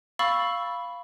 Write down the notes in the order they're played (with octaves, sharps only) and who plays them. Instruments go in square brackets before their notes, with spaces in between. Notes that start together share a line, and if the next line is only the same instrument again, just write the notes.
[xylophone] F5 B5 C#6 E6 A6